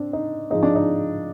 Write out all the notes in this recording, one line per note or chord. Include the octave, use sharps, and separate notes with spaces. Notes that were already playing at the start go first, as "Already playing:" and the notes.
Already playing: C4 D4
D#4
G#2 F3 G#3 D#4
D4
D#4